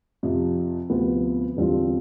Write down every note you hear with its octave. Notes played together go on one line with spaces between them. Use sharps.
F2 C3 F3
D2 C3 F3 B3
E2 D3 G3 C4 F4